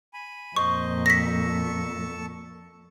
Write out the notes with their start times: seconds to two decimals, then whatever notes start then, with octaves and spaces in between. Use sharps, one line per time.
0.14 G#5 B5
0.56 F2 A#2 C5 D#5 C#6
1.06 A4 A5 C#6 A#6 B6